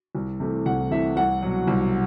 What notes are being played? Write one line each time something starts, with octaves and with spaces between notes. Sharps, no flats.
C2
C3 E3 A3
C2 F#5
C3 E3 A3 E5
C2 F#5
B2 F#3
C2